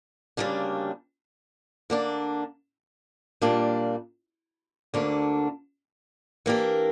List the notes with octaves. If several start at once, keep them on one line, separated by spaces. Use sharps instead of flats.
D2 C#3 G3 A#3 D4
D3 A#3 D4
A#2 G3 A#3 D4
D2 D3 A#3 D4
E3 A#3 D4 G4 A#4